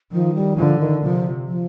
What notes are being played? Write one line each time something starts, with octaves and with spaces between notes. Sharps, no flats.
D#3 F3
G3
D3 F3
D#3
C3 F3
F3